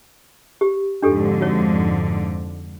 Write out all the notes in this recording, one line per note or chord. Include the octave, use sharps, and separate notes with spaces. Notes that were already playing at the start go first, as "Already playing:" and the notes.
G4
F2 G#2 D3 D4 G4 A4
F#4 C#5